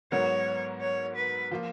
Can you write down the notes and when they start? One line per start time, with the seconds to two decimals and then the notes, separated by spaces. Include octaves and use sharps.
0.12 G#2 F#3 B3 F#4 A#4 C#5
0.81 C#5
1.16 B4
1.51 F3 A#3 F4